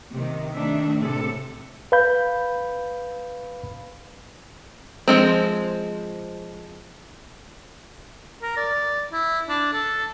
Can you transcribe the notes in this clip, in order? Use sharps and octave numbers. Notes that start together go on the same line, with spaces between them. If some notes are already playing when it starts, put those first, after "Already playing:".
C3 D#3
D#3 A3 D4 E5
A2 C3 A4
B4 F5 B5 G6
F3 G#3 C4
A#4
D5
E4
D4
A4